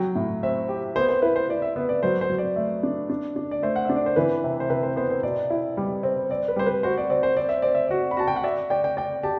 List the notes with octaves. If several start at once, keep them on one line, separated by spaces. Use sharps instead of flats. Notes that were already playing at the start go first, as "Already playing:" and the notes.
Already playing: F#3 G5
A2
C4 E5
G4
B3 C5
C5
E4 B4
C5
E4 D5
E5
B3 E5
D5
F#3 C5
C5
F#3
D5
A3
D4
D4
D4
D5
A3 C5
F#5
D4 E5
D5
C5
E3 B4
C3
C5
C3 B4
C5
B3 C5
C5
B2 D5
E4
G3
C4
C4 D5
B4
G3 C5
B4
F#4 C5
D5
C4 D5
C5
C4 D5
E5
C4 D5
E5
F#4 D5
B5
F#4 A5
G5
F#5
D5 E5
D5 G5
G5
D5 G5
G4 A5